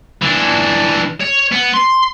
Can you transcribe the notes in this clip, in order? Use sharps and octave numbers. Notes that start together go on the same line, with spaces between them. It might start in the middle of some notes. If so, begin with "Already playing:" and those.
E3 D4
C#5
B3
C6